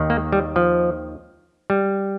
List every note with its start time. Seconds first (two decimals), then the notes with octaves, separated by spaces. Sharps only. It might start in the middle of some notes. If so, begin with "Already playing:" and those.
Already playing: D#2 D#3
0.10 A#3
0.33 G3
0.56 F3
1.70 G3